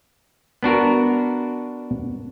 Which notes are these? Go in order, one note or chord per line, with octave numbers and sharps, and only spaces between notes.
B3 D4 F#4 A#4